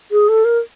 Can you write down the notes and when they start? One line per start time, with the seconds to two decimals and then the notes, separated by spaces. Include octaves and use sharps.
0.11 G#4
0.29 A4
0.45 A#4